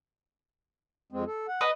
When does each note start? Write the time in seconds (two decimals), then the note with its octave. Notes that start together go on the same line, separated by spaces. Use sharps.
1.12 F2 G#3 C4
1.27 A4
1.48 F#5
1.61 B4 D#5 B5